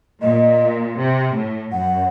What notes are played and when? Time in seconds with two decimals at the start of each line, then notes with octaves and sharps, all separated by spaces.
0.21 A#2 D#5
0.97 C3
1.34 A2
1.72 F#2 F#5